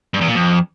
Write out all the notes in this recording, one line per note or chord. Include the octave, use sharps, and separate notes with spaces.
G2
E2
A#2
F2